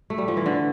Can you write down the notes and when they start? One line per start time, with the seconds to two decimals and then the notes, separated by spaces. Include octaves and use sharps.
0.10 A3
0.18 G3
0.28 F3
0.37 E3
0.46 D3